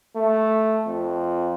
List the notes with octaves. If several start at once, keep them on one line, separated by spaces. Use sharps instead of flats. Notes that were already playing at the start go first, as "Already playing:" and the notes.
A3
F2